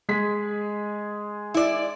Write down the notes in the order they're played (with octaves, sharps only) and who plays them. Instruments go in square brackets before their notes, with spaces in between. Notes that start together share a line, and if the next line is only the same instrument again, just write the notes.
[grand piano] G#3 G#4 B6
[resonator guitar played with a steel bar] E4 D5